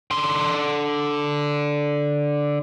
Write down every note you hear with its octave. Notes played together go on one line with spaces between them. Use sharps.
D3 C6